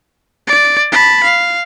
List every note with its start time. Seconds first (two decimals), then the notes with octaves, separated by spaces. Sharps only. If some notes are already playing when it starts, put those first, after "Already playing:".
0.47 D5
0.92 A5 B5
1.24 F5